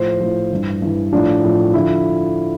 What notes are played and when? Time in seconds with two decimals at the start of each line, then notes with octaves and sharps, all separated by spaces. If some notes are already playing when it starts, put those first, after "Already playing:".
Already playing: A2 F3 C5
0.20 A2 F3
0.51 G2 E3
0.82 G2 E3
1.12 A2 F3 D4
1.43 A2 F3
1.74 D3 F3 E4